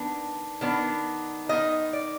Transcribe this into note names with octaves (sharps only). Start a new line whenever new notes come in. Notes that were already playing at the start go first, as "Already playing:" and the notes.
Already playing: D#3 B3 D4
D#3 B3 D4
D#3 B3 D#4 D#5
D5